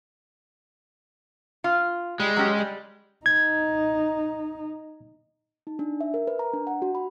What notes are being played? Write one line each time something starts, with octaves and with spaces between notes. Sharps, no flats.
F4
G3 G#3
F#3 C#4 G4
G3
D#4 G#6
D#4
D4
E5
A#4
B4
A#5
D4
F#5
F#4
B5